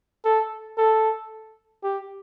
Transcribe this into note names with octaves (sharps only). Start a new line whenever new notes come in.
A4
A4
G4